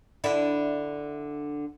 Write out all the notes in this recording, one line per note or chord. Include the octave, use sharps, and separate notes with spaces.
D3 D4 E4